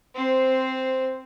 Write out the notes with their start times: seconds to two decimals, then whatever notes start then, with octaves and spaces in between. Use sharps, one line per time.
0.15 C4 C5